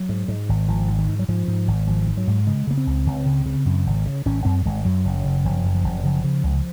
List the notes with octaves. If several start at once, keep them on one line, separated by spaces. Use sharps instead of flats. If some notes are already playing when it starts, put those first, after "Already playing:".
Already playing: F#3
G#2
G#2
G#1
G#1 F3
G#2
D#3
G#2
F#3
G#2 F3
G#2
G#1
G#1 F3
G#2
F#3
G#2
C#3 G#3
C#3 A#3
C4
C#2
C#2
C#3
C#3
F#2
G#1
C#3
G#1 C#4
F#2 C4
G#1 G#3
F#2 F#3
F#1
F#3
C#3
F#1 F3
F#2
F3
F#1
C#3 F3
C#3
C#2